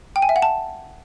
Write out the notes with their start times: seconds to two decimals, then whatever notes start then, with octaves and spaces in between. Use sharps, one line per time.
0.16 G5
0.22 G#5
0.29 E5
0.36 F#5
0.42 A5